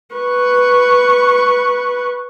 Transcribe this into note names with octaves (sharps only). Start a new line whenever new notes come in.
B4 C#6